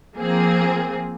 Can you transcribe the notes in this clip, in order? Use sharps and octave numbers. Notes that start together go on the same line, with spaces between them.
F3 A#3 C4 G#4